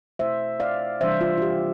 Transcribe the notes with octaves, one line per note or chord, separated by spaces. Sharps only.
B2 A3 E4 C5 E5
D5 F5
C3 E3 G3 D4 C5 E5
F4
F4
G4